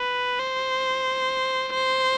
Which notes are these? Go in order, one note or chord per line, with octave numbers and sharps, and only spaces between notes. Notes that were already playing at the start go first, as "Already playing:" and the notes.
Already playing: B4
C5
C5